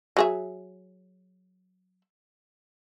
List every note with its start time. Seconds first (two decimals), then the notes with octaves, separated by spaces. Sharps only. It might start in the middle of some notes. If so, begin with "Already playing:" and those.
0.17 F#3 G#4 E5